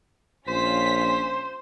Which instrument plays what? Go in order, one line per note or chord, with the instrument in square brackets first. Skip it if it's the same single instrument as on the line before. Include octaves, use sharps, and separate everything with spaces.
[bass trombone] A#1 [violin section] C#4 F4 B6 [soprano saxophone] C5